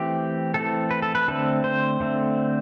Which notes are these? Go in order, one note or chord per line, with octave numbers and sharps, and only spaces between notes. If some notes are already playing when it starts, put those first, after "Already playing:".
Already playing: E3 A3 C4 G4
E3 A3 C4 A4
B4
A4
B4
D3 A3 C4 A4
C5
D3 A3 C4